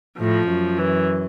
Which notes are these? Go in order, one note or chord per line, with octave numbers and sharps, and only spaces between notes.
A2 F3
F#2
E3